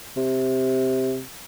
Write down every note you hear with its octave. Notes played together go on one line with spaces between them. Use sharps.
C3